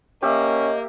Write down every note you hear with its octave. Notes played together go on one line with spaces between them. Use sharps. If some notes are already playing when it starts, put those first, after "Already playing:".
A#3 C#4 G4 D#5 E5